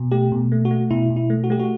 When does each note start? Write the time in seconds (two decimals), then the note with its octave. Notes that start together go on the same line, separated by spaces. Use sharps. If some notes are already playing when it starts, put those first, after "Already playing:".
Already playing: B2
0.11 A3 G4
0.32 B2
0.52 A3
0.65 F#4
0.71 A3
0.91 B2 E4
1.10 B2
1.16 E4
1.30 A3
1.44 F#4
1.50 A3 G4
1.59 F#4